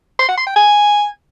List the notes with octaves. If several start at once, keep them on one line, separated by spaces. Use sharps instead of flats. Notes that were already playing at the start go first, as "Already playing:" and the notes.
C6
F#5
C6
G5
G#5